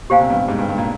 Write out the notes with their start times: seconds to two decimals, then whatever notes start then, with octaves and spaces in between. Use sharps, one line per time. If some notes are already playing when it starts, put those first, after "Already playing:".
0.10 A#2 G4 C5 F5 G#5
0.20 C3
0.30 G2
0.48 G#2
0.59 G2
0.69 G2
0.78 A#2